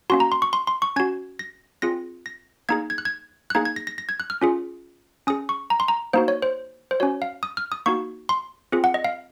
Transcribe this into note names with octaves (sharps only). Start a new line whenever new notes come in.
A#3 C#4 F#4 C6
A#5
C6
C#6
C6
C6
C#6
C#4 F#4 G#6
A#6
C4 F4 G#4 A#6
A#6
A#3 D#4 G#4 G#6
G#6
F#6
G#6
F#6
A#3 D#4 G#4 G#6
G#6
A#6
A#6
A#6
G#6
F#6
F6
C#4 F4 G#4
C#4 G#4 D#6
C#6
A#5
C6
A#5
A#3 D#4 F#4 C5
C#5
C5
C5
C#4 F#4 C#5
F5
D#6
F6
D#6
A#3 D#4 F#4 C#6
C6
C4 F4 G#4
F#5
D#5
F5